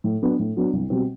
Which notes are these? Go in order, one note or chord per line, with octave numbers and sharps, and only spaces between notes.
A2
F#3 B3 D4
A2
F#3 B3 D4
C2
B2 G3 C4